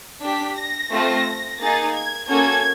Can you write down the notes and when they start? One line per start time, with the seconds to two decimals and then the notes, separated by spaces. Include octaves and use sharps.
0.23 D4 G4 B6
0.58 A#6
0.93 A3 C4 F4
1.61 A#3 D#4 G#4 A6
1.96 G#6
2.30 A#3 C#4 F#4 A4 G#6